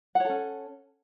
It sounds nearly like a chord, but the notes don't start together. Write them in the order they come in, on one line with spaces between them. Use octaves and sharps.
F#5 C#5 A4 C#4